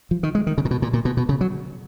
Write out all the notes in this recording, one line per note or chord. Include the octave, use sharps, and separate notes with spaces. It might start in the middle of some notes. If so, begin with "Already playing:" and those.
F3
D#3
G#3
D#3
C#3
A#2
B2
A#2
A#2
B2
B2
C#3
F#3